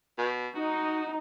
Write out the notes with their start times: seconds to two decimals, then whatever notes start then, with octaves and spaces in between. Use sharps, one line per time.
0.18 B2
0.55 D#4 F#4